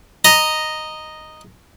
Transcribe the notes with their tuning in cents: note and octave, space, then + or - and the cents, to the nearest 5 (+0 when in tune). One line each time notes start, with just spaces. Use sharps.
D#5 -5 A#5 +0